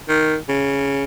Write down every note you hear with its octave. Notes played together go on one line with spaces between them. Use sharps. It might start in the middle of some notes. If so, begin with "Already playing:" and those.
D#3
C#3